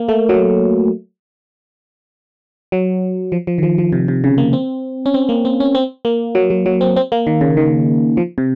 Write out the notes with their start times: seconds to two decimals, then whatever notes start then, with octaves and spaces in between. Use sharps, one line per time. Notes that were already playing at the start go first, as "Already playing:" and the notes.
Already playing: A#3
0.09 A3
0.29 F#3
2.72 F#3
3.32 F3
3.47 F3
3.58 D#3
3.63 F3
3.78 F3
3.92 C3
4.08 C3
4.24 C#3
4.38 A#3
4.53 C4
5.06 C#4
5.14 C4
5.29 A#3
5.45 C4
5.60 C#4
5.75 C4
6.05 A#3
6.35 F#3
6.50 F#3
6.66 F#3
6.81 C4
6.96 C4
7.12 A#3
7.27 D#3
7.41 C#3
7.57 D#3
8.17 F3
8.38 C3